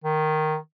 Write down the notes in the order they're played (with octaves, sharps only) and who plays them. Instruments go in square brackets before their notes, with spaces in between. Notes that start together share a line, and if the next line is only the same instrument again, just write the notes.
[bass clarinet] D#3